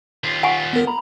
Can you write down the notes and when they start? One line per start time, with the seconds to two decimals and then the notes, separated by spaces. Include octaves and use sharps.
0.24 D#2 F4
0.43 F#5 G#5 C#6
0.73 B3 A#4
0.87 A#5 B5